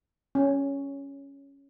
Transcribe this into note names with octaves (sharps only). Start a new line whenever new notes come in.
C#4